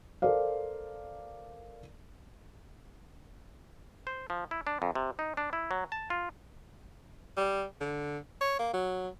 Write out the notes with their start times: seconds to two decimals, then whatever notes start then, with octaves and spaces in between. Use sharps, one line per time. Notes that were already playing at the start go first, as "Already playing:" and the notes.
0.22 A4 A#4 C5 D5 F5
4.07 C5
4.30 F3
4.51 E4
4.67 D4
4.82 F2
4.95 C3
5.19 D#4
5.37 D4
5.53 E4
5.71 F#3
5.92 A5
6.10 F4
7.37 G3
7.80 D3
8.41 C#5
8.59 A#3
8.73 F#3